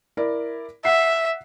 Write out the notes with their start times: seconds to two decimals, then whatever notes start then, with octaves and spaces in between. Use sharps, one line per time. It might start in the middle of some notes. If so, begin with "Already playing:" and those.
0.17 E4 A#4 D5
0.85 E5 F#5 C7